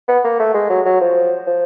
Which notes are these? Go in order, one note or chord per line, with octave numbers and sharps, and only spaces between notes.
B3
A#3
A3
G#3
F#3
F#3
F3
F3